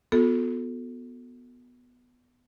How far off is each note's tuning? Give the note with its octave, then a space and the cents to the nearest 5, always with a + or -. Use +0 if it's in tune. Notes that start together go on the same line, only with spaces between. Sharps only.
B3 +0 F#4 -40 A4 +0